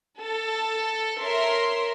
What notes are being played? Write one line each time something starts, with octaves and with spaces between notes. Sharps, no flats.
A4
A#4 C#5 E5 C6